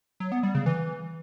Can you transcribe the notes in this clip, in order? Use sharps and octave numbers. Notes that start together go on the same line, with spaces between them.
F#3
B3
G3
C#3
E3